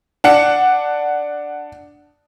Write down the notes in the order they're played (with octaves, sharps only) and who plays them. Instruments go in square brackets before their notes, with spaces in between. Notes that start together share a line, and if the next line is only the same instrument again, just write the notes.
[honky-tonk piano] D4 F#5 C#7